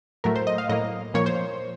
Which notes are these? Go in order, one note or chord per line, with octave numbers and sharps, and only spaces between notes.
A2 F#3 A3 A#4
C5
D#5
F5
A2 F#3 A#3 D#5
A#2 F3 A#3 C#5
C5